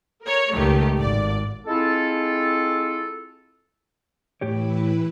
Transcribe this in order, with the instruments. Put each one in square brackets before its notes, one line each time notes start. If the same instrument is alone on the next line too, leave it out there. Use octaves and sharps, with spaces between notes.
[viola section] A#4 C#5
[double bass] C#2 [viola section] D#3 A3 G4
[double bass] G#1 [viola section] D5
[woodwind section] G#3 C4 E4 F4 A4
[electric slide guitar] A2 G4 C#5 [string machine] E3 E4 B4